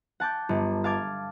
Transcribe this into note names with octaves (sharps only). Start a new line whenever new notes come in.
F#5 A5 D6 G6
G1
F5 A5 D6 G#6